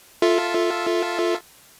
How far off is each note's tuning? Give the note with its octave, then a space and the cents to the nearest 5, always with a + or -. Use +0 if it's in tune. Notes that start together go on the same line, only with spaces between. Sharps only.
F4 +0 A4 +0 E5 +0